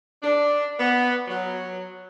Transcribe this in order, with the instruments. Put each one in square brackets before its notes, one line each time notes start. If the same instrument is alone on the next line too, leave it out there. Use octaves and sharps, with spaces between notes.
[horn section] D4
B3
F#3